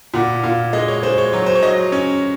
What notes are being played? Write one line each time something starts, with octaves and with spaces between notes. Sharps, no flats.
A#2 F#5
A#2 F5
G#3 D#5
C#5
G#3 C5
C#5
F#3 C#5
C5
C#5
F#3 D#5
C#4